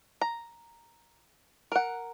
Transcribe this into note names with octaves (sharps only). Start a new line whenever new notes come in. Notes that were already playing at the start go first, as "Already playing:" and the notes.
A#5
A#4 F#5